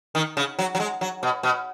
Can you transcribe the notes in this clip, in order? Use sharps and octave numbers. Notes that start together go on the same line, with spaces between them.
D#3
C#3
F#3
F#3
G#3
F#3
B2
B2